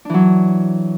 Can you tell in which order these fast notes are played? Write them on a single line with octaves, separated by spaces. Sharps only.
D4 E3 F#3